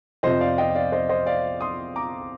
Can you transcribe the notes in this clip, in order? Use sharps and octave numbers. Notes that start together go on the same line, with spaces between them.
F2 C3 F3 C5 D#5
D5 F5
D#5 G5
D5 F5
C5 D#5
C5 D#5
D5 F5
C6 D#6
A#5 D6